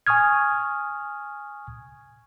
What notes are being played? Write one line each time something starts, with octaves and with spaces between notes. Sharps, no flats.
G#5 C#6 D#6 F6 G#6